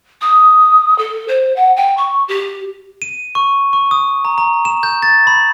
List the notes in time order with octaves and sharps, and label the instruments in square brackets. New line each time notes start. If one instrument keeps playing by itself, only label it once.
[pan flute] D#6
A4
C5
F#5
G5
C#6
G4
[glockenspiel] D#7
C#6
C#6
D#6
A#5
A#5
E7
G6
A6
B5